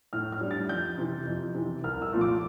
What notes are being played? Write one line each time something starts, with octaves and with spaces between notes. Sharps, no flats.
A2 F6
F6
G3 D4
A6
F2 G6
C3 E3
F2
C3 E3
C2 F6
E6
A#2 F3 A3
D6